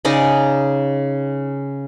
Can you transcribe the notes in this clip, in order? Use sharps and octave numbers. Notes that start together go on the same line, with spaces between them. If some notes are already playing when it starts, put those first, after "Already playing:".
C#3 D#4 D5 D#5